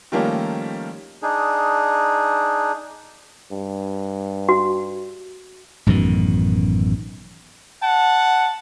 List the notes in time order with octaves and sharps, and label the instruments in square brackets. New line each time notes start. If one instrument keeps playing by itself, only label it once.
[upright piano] D#3 F3 G3 A3 A#3 C#4
[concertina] D4 D#4 G#4
[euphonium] G2
[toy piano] F#4
[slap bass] A1 F#2 B2 D#3
[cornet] F#5 [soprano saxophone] A5